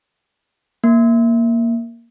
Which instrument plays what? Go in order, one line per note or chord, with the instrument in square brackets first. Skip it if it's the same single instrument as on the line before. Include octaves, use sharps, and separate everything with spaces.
[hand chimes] A#3